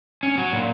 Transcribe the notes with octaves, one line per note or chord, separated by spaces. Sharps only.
C#4
F#3
A#2